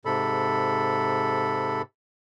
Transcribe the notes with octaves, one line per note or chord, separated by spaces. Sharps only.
G#2 C3 A4 B5